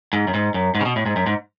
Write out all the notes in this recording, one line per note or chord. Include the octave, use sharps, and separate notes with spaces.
G#2
F#2
G#2
F#2
G#2
C#3
B2
A2
G#2
F#2
G#2